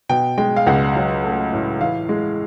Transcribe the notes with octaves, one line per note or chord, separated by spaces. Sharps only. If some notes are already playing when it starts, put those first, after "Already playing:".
B2 G5
G#3 G5
F5
C#2 F#5
F#3
A3
A2
E3 F5
G#3